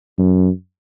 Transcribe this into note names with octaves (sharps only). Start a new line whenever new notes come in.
F#2